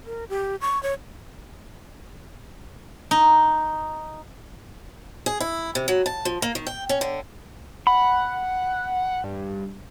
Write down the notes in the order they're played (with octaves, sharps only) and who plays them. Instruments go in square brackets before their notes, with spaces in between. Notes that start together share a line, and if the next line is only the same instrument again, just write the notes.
[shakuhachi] A#4
G4
C#6
C#5
[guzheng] D#4
[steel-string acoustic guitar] G#4
E4
C3
F#3
A5
F3
A#3
D#3
G5
C#4
D3
[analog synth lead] F#5 [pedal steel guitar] B5
[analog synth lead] G2